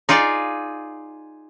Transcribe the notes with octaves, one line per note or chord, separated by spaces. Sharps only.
D#4 F4 G#4 D5